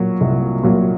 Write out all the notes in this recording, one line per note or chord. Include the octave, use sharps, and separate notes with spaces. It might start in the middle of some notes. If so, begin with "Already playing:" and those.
Already playing: A#2 F#3
C2
A#2 F#3